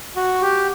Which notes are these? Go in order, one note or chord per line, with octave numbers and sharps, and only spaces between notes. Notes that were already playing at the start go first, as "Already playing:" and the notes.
F#4
G4